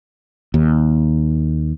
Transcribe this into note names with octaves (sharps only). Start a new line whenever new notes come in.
D#2